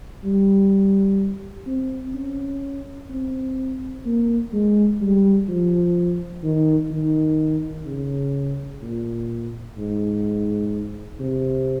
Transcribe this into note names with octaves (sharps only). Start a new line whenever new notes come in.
G3
C4
C#4
C4
A#3
G#3
G3
F3
D#3
D#3
C#3
A#2
G#2
C3